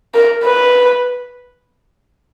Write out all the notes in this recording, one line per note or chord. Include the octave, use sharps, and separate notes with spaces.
A#4
B4